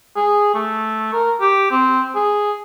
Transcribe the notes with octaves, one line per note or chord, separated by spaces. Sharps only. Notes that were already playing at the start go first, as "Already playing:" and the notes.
G#4
A3
A#4
G4
C4
G#4